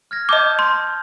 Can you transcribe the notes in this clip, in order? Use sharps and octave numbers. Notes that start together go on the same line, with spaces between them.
F6 G#6 A#6
D#5 A5 D6 D#6 G6
C6